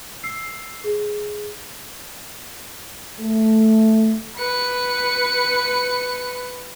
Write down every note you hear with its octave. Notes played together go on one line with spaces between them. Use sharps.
E6 C7
G#4
A3
B4 C#7